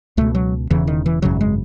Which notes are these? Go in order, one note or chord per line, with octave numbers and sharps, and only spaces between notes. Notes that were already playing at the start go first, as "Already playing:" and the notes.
C#2 B2 A3
F#3
E1 E2 C#3 E3
D#3
E3
G#1 F#2 C#3 F#3
G#3